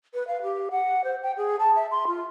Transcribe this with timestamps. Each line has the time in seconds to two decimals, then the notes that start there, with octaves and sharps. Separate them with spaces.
0.14 B4
0.27 F5
0.42 G4
0.71 F#5
1.04 C5
1.23 G5
1.37 G#4
1.59 A5
1.76 E5
1.91 C6
2.07 F4